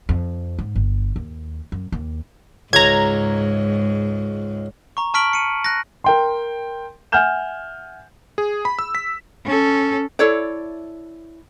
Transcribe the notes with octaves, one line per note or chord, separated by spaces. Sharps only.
F2
G#2
G1
D#2
F#2
D#2
C#2 G#2 A#5 G#6
A#5 C#6
A5 C#6 F6 B6 D7 F#7
C#7 D#7
F#6 A#6
A#4 G5 C6
E5 F#5 G#5 F6 G6 E7
G#4
B5
E6
B6
C#4 A4
E4 A4 C#5 D5